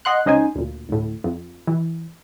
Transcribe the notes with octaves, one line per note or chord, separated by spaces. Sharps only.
D#5 F#5 C6 F#6
C#2 C#4 D#4 C5 G#5
D2 A#2
D2 A2
F2
E3